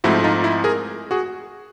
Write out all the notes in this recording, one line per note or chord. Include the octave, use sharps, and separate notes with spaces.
G#2 F3 A3 C4 E4 F#4
D#4 F4
E4
G#4 A#4
F#4 G#4